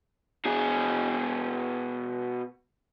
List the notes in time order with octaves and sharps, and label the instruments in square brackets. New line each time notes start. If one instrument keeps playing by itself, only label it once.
[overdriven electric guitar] B2 G#4